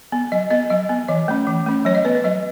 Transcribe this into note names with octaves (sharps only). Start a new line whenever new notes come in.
B3
F#3 D#5
B3 D#5
F#3 D#5
B3
E3 D#5
A3 C#4
E3
A3 C#4
F#3 C#5
D#5
B3 B4
B4
F#3 D#5